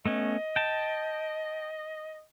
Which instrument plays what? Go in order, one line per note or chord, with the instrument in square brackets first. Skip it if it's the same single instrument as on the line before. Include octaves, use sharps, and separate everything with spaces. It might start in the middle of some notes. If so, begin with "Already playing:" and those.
[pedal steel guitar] A3 B3 C#4 [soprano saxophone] D#5
[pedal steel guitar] G5 A5